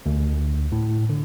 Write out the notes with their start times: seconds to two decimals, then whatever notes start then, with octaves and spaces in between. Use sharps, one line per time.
0.06 D2
0.72 A2
1.09 D3